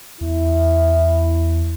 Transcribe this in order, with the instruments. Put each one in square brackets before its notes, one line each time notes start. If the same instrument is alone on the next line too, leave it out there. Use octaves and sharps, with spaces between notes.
[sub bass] E2 [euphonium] E4